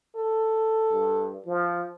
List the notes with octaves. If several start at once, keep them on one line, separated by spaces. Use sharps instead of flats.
A4
G2
F3